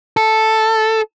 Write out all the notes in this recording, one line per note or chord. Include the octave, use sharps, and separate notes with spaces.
A4